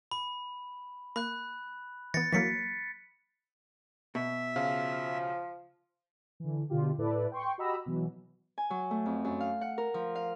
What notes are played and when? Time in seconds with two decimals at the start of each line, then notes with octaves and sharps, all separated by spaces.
0.11 B5
1.16 A#3 B5 F#6
2.14 E3 B3 A6 A#6 C#7
2.33 E3 F#3 A#3 A#6 B6 C#7
4.15 B2 E5
4.56 C#3 F3 F5
6.40 D3 E3
6.69 B2 D3 F4 G4
6.98 A2 E4 A4 B4 D5
7.32 G5 C6 C#6
7.58 F#4 G4 D#5 A#5 B5 E6
7.86 B2 E3 F#3
8.58 G#5
8.70 F#3
8.91 A3
9.06 F2
9.25 F#2
9.40 F5
9.61 F#5
9.78 A#4
9.94 F3
10.15 F5